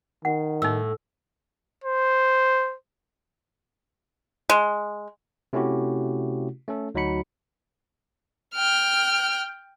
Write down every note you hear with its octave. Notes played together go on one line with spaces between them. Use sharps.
D#3 F#5
A2 D#4 E6
C5
G#3
C3 A3 C#4 E4 F#4 G4
A3 C#4 A4
D2 F#3 D#4 F#4 B5 C#7
G5 F6